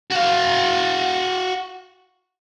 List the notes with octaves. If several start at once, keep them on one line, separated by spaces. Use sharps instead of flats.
F#4 F5